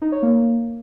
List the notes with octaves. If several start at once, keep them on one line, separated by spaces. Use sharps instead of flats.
D#4
C#5
A#3